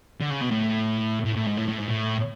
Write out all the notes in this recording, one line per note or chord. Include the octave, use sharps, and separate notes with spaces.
D3
C#3
B2
A2
A2
A2
G#2
A2
A2
G#2
A2